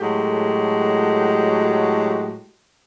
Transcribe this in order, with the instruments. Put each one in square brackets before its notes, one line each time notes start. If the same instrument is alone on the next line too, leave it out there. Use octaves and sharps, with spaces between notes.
[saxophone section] A2 F#3 G#3 F#4 G4 A4